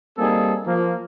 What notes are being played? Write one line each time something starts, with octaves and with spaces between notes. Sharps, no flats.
G3 A#3 C4 D#4 G#4 A4
F3 A#3